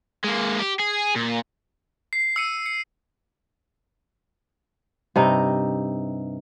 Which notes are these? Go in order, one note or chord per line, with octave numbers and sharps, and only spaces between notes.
G#3 A#3
G4
G#4
A#2
C7
E6 C#7 D#7
C#7
G2 C3 D#4